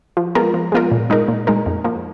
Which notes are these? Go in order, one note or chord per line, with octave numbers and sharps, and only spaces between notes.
F3
G#3 B3 F4 A#4
F3
G#3 B3 F4 A#4
A#2
G#3 D#4 A#4
A#2
G#3 D#4 A#4
F2
F3 A#3